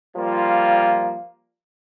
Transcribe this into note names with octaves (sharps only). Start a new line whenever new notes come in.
F3 G3 A#3 F4